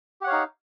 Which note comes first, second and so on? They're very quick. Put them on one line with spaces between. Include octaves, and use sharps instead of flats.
G4 F#5 C#5 F5 D#4